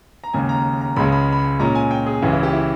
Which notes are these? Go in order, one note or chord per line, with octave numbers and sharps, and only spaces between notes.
A#5
D#2 C#3 G#3 G#5
A#5
A#5
C#2 C#3 G#3 B5
B5
B5
A#2 G#3 C#4 A#5
G#5
G5
G#4
C#2 C#3 E3 G4
E4
G4
E4